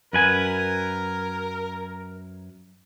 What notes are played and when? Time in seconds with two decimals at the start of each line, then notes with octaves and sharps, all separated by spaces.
0.13 F#2 A#4 B4 G#5